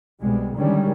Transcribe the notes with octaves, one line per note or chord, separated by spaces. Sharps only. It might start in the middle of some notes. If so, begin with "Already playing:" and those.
C2 B2 G3 G#3
D3 D#3 G3 G#3 C#4